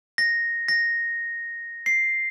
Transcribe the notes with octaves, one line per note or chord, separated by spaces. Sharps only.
A#6
A#6
C7